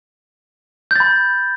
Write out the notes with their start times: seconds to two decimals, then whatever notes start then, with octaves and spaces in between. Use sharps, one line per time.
0.91 G6
0.96 A6
1.00 B5